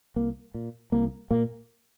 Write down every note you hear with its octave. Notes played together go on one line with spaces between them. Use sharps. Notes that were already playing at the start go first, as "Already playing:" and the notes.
C2 A#3
A#2
C2 A#3
A#2 A#3